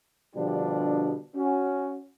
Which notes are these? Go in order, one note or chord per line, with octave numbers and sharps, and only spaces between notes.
B2 D3 F3 G3 D4 G4
C#4 F#4